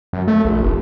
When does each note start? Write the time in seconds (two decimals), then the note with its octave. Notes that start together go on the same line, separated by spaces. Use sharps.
0.13 F#2
0.28 A3
0.45 A#1
0.62 F1